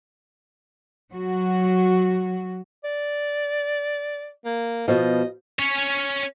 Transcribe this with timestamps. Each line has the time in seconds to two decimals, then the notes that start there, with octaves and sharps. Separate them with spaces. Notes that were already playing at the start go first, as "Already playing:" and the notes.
1.14 F#3 F#4
2.84 D5
4.45 A#3
4.88 B2 F3 D#5
5.59 C#4 C#5